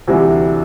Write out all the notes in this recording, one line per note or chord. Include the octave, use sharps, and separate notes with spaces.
D2 C3 E3 G3